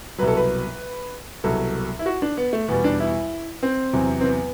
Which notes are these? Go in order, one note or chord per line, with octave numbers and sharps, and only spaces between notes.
C2 B2 F#3 B4
A4
B4
C2 B2 F#3 A4
E4
F#4
D4
B3
A3
E2 B2 G3 B3
D4
E4
C4
E2 C3 F#3
C4
B3